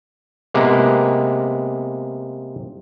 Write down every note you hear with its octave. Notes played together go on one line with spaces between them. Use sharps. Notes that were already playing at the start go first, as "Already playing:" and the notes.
C3 G#3 A#3 B3